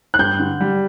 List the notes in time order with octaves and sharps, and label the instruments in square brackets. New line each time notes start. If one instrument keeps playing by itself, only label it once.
[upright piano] F#6
[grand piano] G2 [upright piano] G6
[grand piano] D3
G3